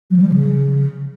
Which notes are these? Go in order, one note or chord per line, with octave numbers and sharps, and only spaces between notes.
F#3
F3
G3
F3
C#3